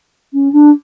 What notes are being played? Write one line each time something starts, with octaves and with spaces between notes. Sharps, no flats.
C#4
D4